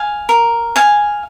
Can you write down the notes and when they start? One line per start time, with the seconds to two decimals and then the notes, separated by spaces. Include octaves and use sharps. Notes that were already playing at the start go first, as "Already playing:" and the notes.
Already playing: F5 G#5
0.29 A#4
0.76 F5 G#5